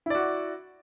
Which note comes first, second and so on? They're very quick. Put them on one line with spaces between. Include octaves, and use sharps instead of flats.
E4 D5 F#4